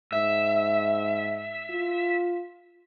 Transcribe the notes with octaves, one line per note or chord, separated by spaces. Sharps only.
G#2 E5
F4